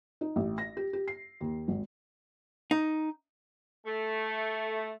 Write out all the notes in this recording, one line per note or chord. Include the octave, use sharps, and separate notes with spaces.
D#4
A1
A#6
G4
G4
C7
D#2
G#1
D#4
A3